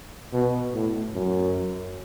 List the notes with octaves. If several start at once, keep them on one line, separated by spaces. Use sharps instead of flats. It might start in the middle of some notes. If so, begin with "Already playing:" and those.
B2
A2
F#2